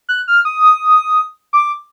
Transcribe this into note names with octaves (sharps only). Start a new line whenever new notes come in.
F#6
F6
D#6
D6